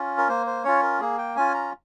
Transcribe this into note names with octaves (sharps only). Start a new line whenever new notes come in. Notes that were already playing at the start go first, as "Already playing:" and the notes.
Already playing: C#4 F4
A#4
A#3 C5
C5
C#4 F4 C#5
A#4
A#3 G#4
G5
C#4 F4 G#5
A#5